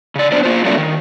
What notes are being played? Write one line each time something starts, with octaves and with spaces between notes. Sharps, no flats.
C#3 D5
B3 D4 C5 D5
A#3 F4 C5
F#3 G3 A3 A#3 C4 D4
D#3